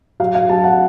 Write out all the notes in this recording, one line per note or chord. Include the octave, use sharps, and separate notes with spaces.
F#3 F5
F5
F#3 A5
F#5